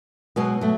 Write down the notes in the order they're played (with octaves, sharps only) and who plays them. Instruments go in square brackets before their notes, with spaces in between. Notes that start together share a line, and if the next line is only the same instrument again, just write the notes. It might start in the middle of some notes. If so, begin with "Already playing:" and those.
[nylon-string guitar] B2 F#3 G#3 B3
F#3 A3